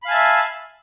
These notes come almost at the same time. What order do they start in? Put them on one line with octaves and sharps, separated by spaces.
B5 F5 G#5 A5 E5